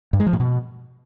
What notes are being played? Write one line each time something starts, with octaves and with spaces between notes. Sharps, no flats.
G2
G#3
F3
A2
B2